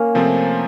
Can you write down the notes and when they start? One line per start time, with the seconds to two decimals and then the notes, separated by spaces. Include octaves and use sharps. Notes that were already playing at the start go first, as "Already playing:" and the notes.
Already playing: A#3 C#4
0.15 C3 F3 A3 C4 F4